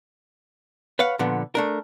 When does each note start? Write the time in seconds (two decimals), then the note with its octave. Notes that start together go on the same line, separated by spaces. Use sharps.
0.99 B4 C#5 F5 F#5
1.19 A#2 D3 F3 B3
1.55 A3 D4 A#4